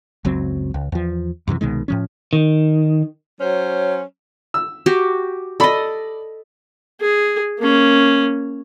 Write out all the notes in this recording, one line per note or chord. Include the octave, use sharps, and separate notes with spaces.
F#1 C#2 F#3 C4
C#2
E2 F3
F#2 C3 D#3 E3
C2 B2 D#3 G#3
A2 F3 C#4
D#3
F#3 C#4 C5
E6
F#4 G4
A4 D5 D#5 B5
G#4
A#3 C#4